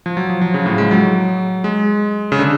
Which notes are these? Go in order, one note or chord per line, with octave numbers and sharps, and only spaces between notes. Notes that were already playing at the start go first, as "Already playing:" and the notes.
F3
F#3
F3
F3
C#3
A2
G#3
F#3
G#3
C#3
D3